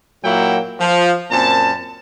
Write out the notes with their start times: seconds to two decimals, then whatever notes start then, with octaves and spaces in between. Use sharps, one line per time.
0.24 A#2 F#3 A#3 E4 F#5 G5
0.80 F3
1.31 F#2 A#2 C4 A5